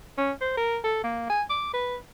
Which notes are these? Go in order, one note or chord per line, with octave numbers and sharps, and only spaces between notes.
C#4
C5
A#4
A4
A#3
G#5
D6
B4